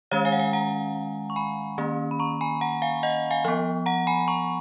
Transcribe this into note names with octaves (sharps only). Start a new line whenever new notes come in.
D#3 G#3 C#4 C#5 F5
F5 G#5
F#5
F5 G#5
F#5 A#5
C#6
G#5 B5
D#3 A#3 C#4
B5
A#5 C#6
G#5 B5
F#5 A#5
F5 G#5
D#5 F#5
F5 G#5
F3 B3
F#5 A#5
G#5 B5
A#5 C#6